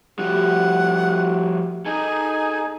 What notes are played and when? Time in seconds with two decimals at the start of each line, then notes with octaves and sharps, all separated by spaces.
0.19 F3 G3 A3 F#4 G4 F#5
1.86 D#4 G#4 A4 G#5